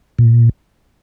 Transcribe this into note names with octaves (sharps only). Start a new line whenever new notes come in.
A#2